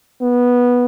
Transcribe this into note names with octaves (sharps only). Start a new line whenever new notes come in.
B3